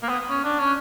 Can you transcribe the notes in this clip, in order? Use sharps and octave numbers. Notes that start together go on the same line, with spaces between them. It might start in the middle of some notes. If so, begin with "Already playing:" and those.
A#3
B3
C#4
D4
C#4